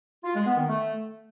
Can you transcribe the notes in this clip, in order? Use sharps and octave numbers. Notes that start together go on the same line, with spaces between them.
F4
G#3
B3
D#3
A3